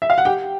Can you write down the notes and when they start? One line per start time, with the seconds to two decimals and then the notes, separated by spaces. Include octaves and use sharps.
0.02 E5
0.10 F5
0.18 F#5
0.25 G4 G5